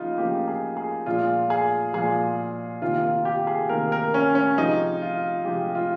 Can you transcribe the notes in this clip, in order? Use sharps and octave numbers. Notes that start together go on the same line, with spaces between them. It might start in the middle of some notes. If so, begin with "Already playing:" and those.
Already playing: C#3 F3 A#3 D#4 F4
C#3 F3 A#3 G4
G#4
G#4
A#2 F3 G#3 F4
G#4
A#2 F3 G#3 G#4
C3 D#3 A#3 F4
F4
G4
G#4
C3 D#3 A#3 A#4
A#4
C#4
C#4
C3 F3 G#3 D#4
F4
C3 F3 G#3 G4
F4